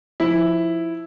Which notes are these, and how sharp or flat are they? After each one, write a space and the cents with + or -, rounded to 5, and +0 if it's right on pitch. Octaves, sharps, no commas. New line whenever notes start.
F3 +0 E4 +0